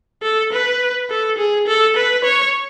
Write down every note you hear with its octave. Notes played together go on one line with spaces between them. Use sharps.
A4
B4
A4
G#4
A4
B4
C#5